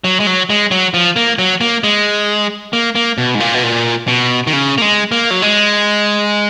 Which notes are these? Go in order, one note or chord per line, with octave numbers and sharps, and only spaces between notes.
F#3
G#3
F#3
G#3
F#3
F3
A#3
F#3
A#3
G#3
A#3
A#3
B2
G#2
A#2
B2
A#2
B2
D#3
C#3
A#3
G#3
A#3
F#3
G#3